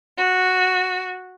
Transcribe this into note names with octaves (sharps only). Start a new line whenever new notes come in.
F#4